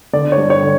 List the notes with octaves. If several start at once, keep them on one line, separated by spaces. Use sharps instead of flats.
D3 D5
C#5
G2
C#5
D3